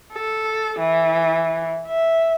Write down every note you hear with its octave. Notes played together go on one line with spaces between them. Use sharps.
A4
E3
E5